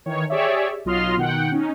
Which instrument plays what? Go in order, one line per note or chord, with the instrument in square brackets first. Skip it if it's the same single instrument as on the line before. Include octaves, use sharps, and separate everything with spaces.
[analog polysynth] D#3 E3 C#5
G4 G#4 C#5 D5 E5
B1 F#3 F4 D#5 C6 F6
B2 D#3 F#5 G5
C#4 D#4